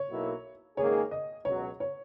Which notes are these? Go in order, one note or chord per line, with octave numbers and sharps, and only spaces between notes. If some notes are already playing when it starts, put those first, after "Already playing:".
Already playing: C#5
B1 B2 F#3 A#3 E4
G#2 D#3 A#3 C#4 G#4 C#5
D#5
C#2 B2 F#3 C#5
C#5